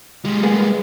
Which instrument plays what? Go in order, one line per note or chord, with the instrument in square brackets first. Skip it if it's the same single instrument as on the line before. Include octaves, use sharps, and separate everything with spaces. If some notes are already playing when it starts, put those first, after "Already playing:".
[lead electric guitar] G3 G#3
[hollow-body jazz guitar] A#3 B3 G#4